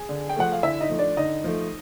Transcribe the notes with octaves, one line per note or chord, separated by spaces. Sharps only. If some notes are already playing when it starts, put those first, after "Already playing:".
Already playing: G#4
D3
G5
F3 A3 F#5
F5
D3 E4 E5
D#4 D#5
F3 A3
D4 D5
D3 D#4 D#5
F3 A3